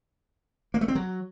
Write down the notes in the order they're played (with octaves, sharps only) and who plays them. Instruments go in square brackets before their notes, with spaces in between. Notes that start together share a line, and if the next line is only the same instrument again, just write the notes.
[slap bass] A#3
A3
C4
F#3